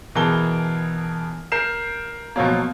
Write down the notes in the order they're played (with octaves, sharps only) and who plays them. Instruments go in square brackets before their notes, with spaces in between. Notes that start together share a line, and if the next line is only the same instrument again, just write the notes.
[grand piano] B2 E3 G#4 A#4 A5 G7
A#4 G6 C7 E7
B2 F3 F#3 A#3